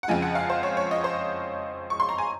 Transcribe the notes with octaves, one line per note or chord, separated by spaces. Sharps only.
F#5
F2 C#3 F3 G#3 G#5
F#5
F5
C5
C#5
C#5
D#5
C5
C#6
C6
A#5
G#5